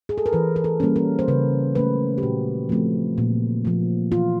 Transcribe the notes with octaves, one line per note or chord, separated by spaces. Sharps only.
G#4
A4
A#4
E3 B4
A#4
A4
G3 A#3 C#4
A#4
C5
C#3 B4
F#3 A3 C#4 B4
G4
A#2 F#4
F3 A3 C4
A#2
F3 A#3
E3 F4